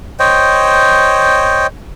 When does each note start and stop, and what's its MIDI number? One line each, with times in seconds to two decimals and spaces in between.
0.20 1.67 72
0.20 1.67 73
0.20 1.67 75
0.20 1.67 79